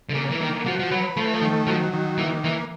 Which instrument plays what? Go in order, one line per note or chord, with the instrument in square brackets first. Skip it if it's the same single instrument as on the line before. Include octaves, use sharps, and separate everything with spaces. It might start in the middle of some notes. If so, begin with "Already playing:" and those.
[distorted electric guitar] D3
[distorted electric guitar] C#3 [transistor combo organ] A#3
[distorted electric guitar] E3
[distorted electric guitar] D#3 [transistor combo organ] A#3
[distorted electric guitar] F3 [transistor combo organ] F#4
[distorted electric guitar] F3
[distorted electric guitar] F#3 [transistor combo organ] B4
[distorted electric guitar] F3 [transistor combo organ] A3
[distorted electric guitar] E3
F3
[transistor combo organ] D#3
[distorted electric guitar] F3 [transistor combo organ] F#3
[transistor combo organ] D#3
[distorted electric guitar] E3 [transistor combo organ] A#3
[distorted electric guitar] E3 [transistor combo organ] A#3